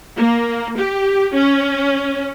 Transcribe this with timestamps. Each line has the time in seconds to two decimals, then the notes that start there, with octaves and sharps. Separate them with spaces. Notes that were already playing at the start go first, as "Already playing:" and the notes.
0.17 A#3
0.78 G4
1.34 C#4